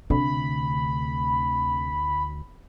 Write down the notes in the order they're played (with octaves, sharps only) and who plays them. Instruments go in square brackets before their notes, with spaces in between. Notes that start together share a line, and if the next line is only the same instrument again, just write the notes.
[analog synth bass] D2 [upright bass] C3 [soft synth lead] B5